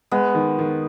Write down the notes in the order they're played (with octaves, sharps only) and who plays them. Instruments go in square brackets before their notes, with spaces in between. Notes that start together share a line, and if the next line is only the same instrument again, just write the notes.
[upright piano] G#3 [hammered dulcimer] B3
[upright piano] D#3
D#3